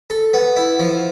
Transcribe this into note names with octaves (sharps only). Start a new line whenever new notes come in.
A4
B3
E4
F3